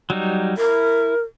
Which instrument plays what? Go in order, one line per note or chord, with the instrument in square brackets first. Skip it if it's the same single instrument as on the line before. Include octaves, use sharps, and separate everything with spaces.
[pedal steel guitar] F#3 G3 D#4
[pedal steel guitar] E4 [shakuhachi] A#4